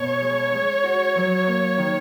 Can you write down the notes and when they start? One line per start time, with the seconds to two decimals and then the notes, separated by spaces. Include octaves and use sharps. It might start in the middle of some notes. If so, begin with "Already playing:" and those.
Already playing: B2 C#5
0.21 G#3
0.52 G#3
0.84 F#4
1.16 F#3
1.47 A#3
1.78 D#3